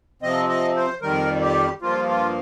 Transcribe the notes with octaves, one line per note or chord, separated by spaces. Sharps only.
C3 F3 C4 D#5
D#5
C5
F2 D#3 G3 A#4
G4
G2 F3 A#3 F4
F4